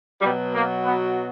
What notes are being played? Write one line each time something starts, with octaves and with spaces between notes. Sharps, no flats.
B2 F#3 G3
A#3
B3